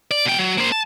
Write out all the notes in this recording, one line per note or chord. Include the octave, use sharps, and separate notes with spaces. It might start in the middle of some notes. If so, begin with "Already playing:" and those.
D5
B2 G5
F#3
A#3 C5
A5